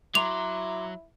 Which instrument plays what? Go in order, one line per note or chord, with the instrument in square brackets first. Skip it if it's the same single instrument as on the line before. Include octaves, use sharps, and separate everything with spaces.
[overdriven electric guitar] F#3 [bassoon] E4 [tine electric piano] A#5 C6 D6 [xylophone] F7